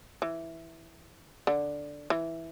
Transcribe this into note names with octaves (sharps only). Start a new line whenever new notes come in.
E3
D3
E3